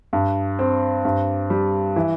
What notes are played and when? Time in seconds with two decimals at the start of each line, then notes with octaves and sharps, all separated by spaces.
0.13 G2
0.59 C4
1.05 G2
1.50 G3
1.96 E3